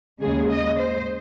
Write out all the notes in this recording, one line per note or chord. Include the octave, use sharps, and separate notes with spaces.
D#2 C#3 G#3 G#4
D#5
C5